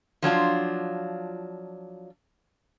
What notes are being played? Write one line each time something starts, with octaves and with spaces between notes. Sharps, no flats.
F3 F#3 D4 F4